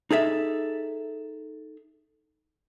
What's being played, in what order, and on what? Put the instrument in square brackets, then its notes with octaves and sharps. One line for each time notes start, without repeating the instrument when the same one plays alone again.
[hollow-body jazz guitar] D#4 G#4 A4 E5